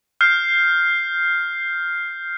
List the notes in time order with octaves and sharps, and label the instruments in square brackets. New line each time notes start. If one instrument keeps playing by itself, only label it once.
[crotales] F6 G6 C7